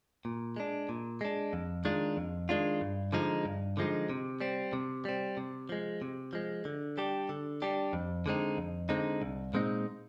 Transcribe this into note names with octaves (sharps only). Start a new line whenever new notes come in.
A#2
G#3 D4
A#2
G#3 D4
F2
D#3 G#3 D4 F4
F2
D#3 G#3 D4 F4
G2
D3 F3 G#3 D#4
G2
D3 F3 G#3 D#4
C3
G3 C4
C3
G3 C4
C3
F3 G#3
C3
F3 G#3
D3
G3 D4 G4
D3
G3 D4 G4
F2
D3 G#3 C4 D#4
F2
D3 G#3 C4 D#4
C2
A#2 G#3 C4 D#4